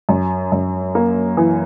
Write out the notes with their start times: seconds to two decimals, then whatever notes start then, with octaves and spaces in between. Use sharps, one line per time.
0.09 F#2
0.52 F#2
0.95 A#3
1.37 E3